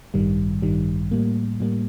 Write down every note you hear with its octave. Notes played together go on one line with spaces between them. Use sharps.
A1 G2 D#3 G3
A1 G2 D#3 G3
A2 G3 A#3
A2 G3 A#3